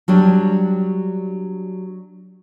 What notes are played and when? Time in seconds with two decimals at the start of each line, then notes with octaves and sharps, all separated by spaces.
0.08 F#3 G3 D4